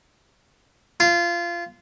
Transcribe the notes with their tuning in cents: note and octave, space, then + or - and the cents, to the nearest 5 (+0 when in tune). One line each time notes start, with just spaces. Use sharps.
F4 -20